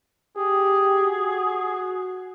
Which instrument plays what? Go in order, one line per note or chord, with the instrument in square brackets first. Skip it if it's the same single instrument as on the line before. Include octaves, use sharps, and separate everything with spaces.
[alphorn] G4 [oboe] G#4
[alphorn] F#4